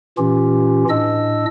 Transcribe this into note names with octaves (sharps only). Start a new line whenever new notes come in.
A#2 E3 C#4 F4 G4
A2 D4 D#5 E6